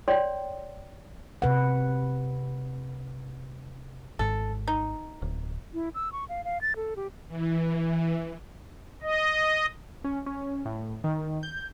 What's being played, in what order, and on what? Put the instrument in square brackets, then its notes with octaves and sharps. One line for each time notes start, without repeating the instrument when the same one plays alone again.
[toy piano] C#5 D5 G5 C6
[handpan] C3 B4 F#5
[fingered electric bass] G#1 G#2 [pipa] A4
[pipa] D#4
[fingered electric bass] D1
[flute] E4
E6
C#6
F5
F5
A6
A4
G4
[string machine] E3
[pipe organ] D#5
[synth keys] C#4
C#4
A2
D#3
G6